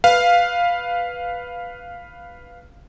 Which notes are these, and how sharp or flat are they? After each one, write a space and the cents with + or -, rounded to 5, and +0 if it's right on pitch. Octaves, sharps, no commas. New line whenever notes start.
B4 +0 F5 +0